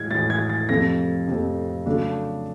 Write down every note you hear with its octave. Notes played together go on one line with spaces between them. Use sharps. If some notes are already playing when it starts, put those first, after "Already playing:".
Already playing: A2 E3 G#3 G#6
A2 E3 G#3 A6
G#6
A6
F2 C3 F3 A3 C4 A#6
F2 C3 F3 A3 C4
C#3 F#3 A3 D4